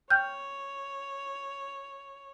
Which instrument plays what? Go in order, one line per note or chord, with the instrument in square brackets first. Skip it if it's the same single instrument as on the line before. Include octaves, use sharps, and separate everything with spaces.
[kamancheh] C#5 [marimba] G5 F6 G6